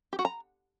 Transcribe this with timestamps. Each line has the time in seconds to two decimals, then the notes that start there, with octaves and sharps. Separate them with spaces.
0.13 G4
0.19 F#4
0.25 A#5